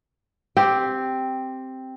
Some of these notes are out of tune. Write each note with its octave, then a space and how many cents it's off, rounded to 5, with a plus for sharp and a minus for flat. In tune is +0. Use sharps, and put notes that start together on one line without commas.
C4 +0 G4 +0